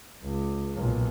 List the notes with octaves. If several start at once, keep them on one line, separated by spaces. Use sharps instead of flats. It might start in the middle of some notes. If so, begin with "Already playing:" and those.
C#2
B1 A#2